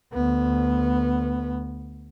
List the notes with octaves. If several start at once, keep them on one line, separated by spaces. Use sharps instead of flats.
D2 B3